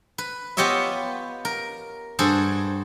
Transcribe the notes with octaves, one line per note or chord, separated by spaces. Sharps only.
B4
B3 F4 G4 C#5 D#5 E5
A#4
G2 F#4 G#4 A4 C5